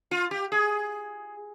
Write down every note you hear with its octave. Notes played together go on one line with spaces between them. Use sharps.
F4
G4
G#4